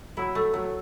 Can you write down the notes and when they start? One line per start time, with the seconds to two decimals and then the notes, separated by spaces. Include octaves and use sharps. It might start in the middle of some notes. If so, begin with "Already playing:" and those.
0.17 F#3 E4
0.35 A3
0.53 F#3 A3